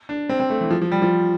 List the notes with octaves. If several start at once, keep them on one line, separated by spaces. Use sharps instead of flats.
D4
C4
C4
A3
E3
F3
F3
G3
F3